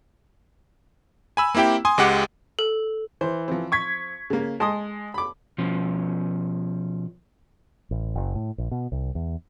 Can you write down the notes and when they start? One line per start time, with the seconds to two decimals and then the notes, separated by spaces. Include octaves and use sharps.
1.37 G#5 B5 E6
1.55 A#3 C4 E4 G4 G5
1.85 G#5 C6 D#6
1.98 C#2 G#3 G4 F#5 D6
2.59 A4
3.21 E3 C5
3.48 F3 C4
3.72 C#6 G#6 B6
4.30 C#3 A#3
4.60 G#3 A5 C6 D#6
5.14 B5 D6
5.58 B2 F3 C#4
7.91 A1
8.15 F#1
8.35 A2
8.58 A#1
8.71 B2
8.92 C2
9.15 E2